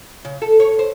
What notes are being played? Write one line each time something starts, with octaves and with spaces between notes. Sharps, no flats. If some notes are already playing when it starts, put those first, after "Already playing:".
C#3
A4
C#5
C5